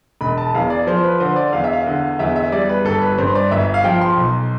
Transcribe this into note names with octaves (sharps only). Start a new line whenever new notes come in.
E1 B5
A5
E2 F5
D5
F3 C5
B4
D3 C5
D5
E2 F5
E5
F5
D3
E2 E5
E5
G3 D5
B4
G1 A4
B4
G2 C5
D5
G1 E5
F5
F3 G5
C6
B1